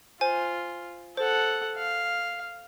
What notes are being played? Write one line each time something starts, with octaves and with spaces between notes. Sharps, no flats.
F4 C5 G#5
A4 C5 F#5
F5